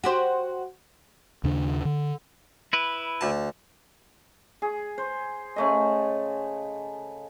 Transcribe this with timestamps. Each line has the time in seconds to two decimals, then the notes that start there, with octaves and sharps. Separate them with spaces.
0.04 F#4 G4 C5
1.44 D#2 C#3 D4
1.85 D3
2.73 E4 B4
3.21 D2 A5
4.62 G#4
4.98 C5
5.56 C#3 A3 D#5